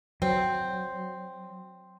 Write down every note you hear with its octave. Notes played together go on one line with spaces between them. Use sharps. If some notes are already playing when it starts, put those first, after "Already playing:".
F#3 C4